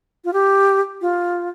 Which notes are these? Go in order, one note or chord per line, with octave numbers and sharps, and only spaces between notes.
F4
G4
F4